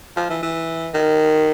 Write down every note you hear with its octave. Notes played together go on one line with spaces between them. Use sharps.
F3
E3
E3
D#3